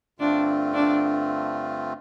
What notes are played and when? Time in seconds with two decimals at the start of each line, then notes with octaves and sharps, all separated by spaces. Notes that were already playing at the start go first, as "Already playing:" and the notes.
0.19 G2 D3 A3 C4 D4 F4
0.74 D4